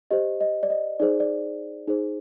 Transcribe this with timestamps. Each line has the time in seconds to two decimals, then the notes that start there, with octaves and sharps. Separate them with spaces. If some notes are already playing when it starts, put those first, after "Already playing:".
0.11 G4 C5 D#5
0.41 D#5
0.63 D5
0.70 D#5
1.00 D#4 G#4 C5 D5
1.20 D5
1.88 D#4 G#4 C5